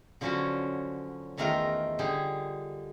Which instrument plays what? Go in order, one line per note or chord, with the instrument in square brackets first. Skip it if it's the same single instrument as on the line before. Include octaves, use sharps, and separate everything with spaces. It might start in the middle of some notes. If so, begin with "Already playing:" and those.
[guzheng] D3 F3 F#3 C#4 D4 F#4
E2 D#3 A3 F4 A#4 A#5
D3 G3 G#4 G5